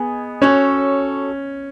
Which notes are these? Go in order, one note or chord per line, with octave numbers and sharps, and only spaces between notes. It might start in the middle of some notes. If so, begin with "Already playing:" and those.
Already playing: B3 G#4 D#5 G#5
C#4 F#4 A4 C#5